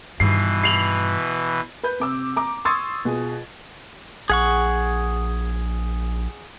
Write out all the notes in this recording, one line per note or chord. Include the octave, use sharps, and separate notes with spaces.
G2 B2 D#3 E3 C7
C7 F7 F#7
B4 G6
C3 D6 E6
A#5 D6
C6 C#6 D#6 E6 G#6 A6
B2 F4 G#4
A#1 G#4 F#5 C#6